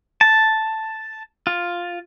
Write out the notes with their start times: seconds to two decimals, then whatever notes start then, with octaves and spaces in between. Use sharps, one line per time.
0.21 A5
1.47 F4